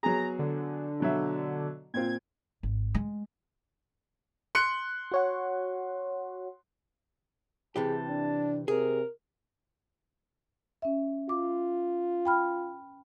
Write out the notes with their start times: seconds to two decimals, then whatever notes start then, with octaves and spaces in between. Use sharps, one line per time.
0.03 F#3 B3 G#4 A#5
0.39 D3
1.00 B2 F#3 E5
1.94 A#2 C4 F4 G#6
2.63 G#1
2.95 G#3
4.55 C6 F#6 C#7
5.12 F#4 C#5 F#5
7.76 C3 E3 G4 G#4 A5
8.09 D4
8.68 C3 G#4 A#4
10.82 C#4 E5
11.29 F4 D6
12.25 G5 B5 F6